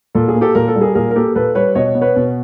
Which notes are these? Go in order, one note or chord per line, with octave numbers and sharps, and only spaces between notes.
A#2 A4
G#4
A#3
G4 A4
A#2 A#4
A4
G3
G#4 A#4
A#2 G#4 A#4
A#4
A#3 G4 A4
A#2 A4 B4
G3 B4 C#5
B2 C#5 D#5
B3
B4 C#5
B2